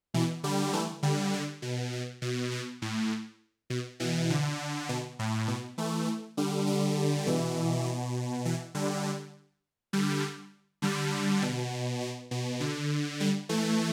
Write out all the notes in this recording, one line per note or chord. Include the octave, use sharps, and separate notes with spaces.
B2 E3
D3 G3
E3 A3
D3 G3
D3
B2
B2
B2
B2
A2
B2
B2 E3
D3
B2
A2
B2
E3 A3
D3 G3
D3 G3
B2 E3
B2
B2 E3
D3 G3
D3 G3
D3 G3
B2
B2
B2
D3
D3 G3
E3 A3